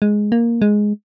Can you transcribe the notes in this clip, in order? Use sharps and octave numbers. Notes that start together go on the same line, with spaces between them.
G#3
A#3
G#3